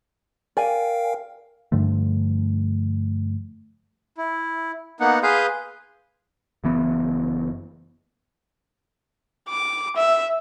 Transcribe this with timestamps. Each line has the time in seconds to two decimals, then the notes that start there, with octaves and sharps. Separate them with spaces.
0.57 A#4 D5 F5 G5 G#5
1.72 G2 D3 F3 A3
4.18 E4
5.00 A#3 B3 D#4 F#5
5.23 G#4 B4 F5 C6 D#6 G6
6.64 F#1 E3 B3
9.49 D6
9.96 E5